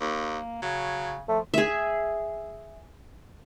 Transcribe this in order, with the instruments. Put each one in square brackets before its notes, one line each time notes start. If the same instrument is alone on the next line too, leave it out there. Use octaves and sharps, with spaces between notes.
[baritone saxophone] D#2 [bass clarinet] A#3
[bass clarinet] C#3 [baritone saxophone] F#3
[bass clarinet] F3 [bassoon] A3
[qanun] G#4 E5